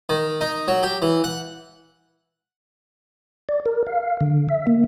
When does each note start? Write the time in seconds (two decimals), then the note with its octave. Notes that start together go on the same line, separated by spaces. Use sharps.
0.09 D#3
0.41 D#4
0.68 F#3
0.83 G4
1.02 E3
1.24 F#5
3.49 D5
3.66 A#4
3.87 F5
4.21 D3
4.49 E5
4.67 A#3